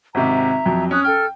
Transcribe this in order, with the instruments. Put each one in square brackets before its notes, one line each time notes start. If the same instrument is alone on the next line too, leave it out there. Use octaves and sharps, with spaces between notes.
[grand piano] G#1 C3 [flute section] E5 A#5
[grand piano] F2 F#3
[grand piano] C#4 [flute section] D#6 F#6
[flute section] A4 F6 [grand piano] G5